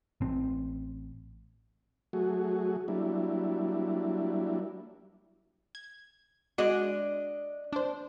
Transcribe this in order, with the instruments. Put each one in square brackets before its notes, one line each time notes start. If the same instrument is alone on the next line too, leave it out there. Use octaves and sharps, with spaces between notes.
[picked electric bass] A1 C4
[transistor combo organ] F#3 A3 F#4 G#4
F#3 G3 A#3 D4 E4
[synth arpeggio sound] G#6
[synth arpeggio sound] G#3 F#4 [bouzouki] D4 D#5
[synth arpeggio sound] D4 C5